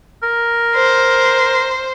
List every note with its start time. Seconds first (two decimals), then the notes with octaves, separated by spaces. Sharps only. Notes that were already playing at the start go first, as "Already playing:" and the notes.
0.23 A#4
0.75 C5